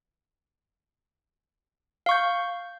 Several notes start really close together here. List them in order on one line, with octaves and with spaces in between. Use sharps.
F5 C#6 G6